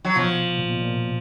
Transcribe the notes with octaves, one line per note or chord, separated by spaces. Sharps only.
F#3
B2 F3
A#2
B2
A#2